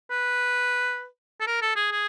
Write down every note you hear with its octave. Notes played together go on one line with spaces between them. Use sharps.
B4
A4
A#4
A4
G#4
G#4